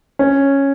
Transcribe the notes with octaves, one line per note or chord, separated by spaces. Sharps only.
C#4